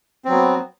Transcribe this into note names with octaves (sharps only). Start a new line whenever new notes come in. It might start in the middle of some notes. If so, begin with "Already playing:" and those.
F#3 B3 C4